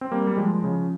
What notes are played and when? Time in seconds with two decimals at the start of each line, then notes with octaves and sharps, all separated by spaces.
0.01 C4
0.12 G3 A#3
0.27 G3
0.37 F3 G#3
0.63 C#3 F3